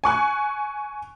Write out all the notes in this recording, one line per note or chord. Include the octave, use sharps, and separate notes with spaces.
G#5 C#6 F#6